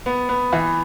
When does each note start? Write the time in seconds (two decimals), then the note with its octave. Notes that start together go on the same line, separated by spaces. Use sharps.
0.06 B3
0.29 B3
0.53 E3